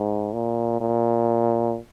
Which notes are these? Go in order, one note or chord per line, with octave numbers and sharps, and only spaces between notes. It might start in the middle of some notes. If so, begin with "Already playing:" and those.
Already playing: G#2
A#2
A#2